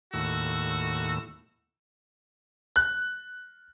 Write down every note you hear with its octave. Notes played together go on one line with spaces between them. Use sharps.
D#2 A2 F#4 E6
F#6